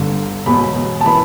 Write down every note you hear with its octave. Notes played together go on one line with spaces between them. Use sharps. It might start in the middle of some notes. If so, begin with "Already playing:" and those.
Already playing: G1 G2 D3
E1 E2 B2 B5
A5
E3 B3 B5